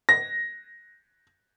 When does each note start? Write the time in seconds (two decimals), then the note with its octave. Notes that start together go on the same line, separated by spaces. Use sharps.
0.09 A#6